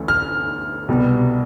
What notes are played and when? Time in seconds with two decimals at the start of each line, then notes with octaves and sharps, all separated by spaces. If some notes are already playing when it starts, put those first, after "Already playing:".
Already playing: D2 E3 A3 C#4
0.08 F6
0.88 C2 B2 G3 B3